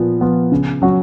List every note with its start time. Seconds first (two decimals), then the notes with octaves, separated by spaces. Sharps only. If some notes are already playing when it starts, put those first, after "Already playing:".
Already playing: A#2 F3 B3
0.21 F3 B3 F4
0.52 C#3
0.82 F#3 C#4 F#4